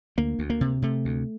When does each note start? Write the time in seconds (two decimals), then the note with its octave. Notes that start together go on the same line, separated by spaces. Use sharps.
0.18 D2 A#3
0.39 D2
0.50 A#3
0.61 C3
0.82 C3 A3
1.05 D2